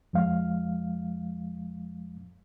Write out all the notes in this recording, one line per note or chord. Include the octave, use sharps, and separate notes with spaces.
F2 F3 G#3 F5